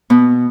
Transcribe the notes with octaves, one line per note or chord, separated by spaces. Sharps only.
B2 B3